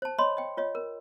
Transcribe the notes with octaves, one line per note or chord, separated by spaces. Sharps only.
C5 A5
C#5 D#5 B5 C6
D#5 G5
F4 C#5 D#5
A#4